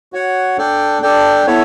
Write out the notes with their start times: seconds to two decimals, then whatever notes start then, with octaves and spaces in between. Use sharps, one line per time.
0.13 F#4 C#5 F#5
0.57 D4 A4 D5 G5
1.02 D4 A4 D5 G5
1.46 B3 E4 A4 C#5